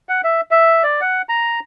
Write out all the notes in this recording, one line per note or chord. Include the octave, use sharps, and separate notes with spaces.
F#5
E5
E5
D5
F#5
A#5